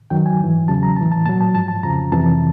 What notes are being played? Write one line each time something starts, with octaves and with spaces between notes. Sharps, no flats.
F#2 D#3 F#3 G5
G#5
G#2 E3
E2 C#3 F#3 A5
A#5
A2 E3 A5
A5
A#2 F#3 A5
A5
G#2 F3 A5
A5
F2 C#3 F3 A#5
F2 C3 E3 A5